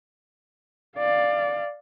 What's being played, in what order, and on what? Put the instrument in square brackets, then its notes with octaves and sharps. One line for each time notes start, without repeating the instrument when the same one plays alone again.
[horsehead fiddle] D5 F5